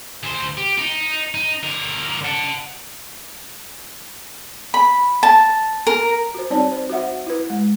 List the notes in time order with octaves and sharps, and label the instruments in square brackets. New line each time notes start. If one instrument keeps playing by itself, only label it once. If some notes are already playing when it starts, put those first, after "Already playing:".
[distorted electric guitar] D2 C5
G4
D#4
D#4
D3 A#4
F#5 A5
[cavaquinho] B5
A5
A#4
[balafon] F#4 C5
G3 C4 D#4 C#5 D5 A5
C5
F#4 C5 E5 F#5
E4 B4
G#3